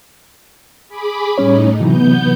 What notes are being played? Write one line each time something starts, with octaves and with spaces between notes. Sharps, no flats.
G#4 B5 D6
A2 G3 C#4 D#4 C#5
C3 E3 F#3 B3 G6